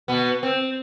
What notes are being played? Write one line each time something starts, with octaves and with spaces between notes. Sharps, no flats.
B2 B3
C4